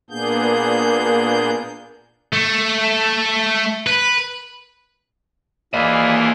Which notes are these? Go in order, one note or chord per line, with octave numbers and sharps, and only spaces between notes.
A#2 A#3 B3 D4 G#4 G6
A3
B4
E3 A#3 F4 G#4 D5 D#5 F5 B5